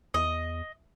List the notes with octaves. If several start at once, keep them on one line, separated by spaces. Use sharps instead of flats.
E2 D#5